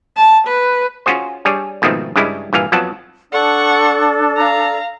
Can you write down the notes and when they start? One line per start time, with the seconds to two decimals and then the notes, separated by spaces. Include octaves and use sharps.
0.17 A5
0.47 B4
1.06 C#4 F4 F#4 G#4 C5
1.45 G3 D4 G#4 C#5
1.82 G#2 B2 D#3 F3 A3 C4
2.16 G2 C#3 G3 G#3 E4
2.53 G2 A#2 E3 F5 G#5
2.72 F2 F3 F#3 B3 F#5 A5
3.32 D4 A4 D5 F#5 C#6
4.36 F5 A#5